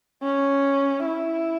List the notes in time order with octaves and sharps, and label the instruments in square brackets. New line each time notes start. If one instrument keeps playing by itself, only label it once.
[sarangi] C#4
E4